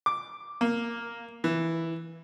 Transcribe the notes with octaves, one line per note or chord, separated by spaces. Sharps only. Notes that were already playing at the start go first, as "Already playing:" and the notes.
D6
A#3
E3